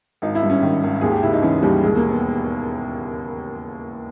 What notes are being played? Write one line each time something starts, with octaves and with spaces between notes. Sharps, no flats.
G#1 D#4
E4
G2
C#4
D#3
G#1
D#2 G#4
G4
C#3 E4
D#4
E3 C#4
D#2 G3
E1 G#3
A#3
B3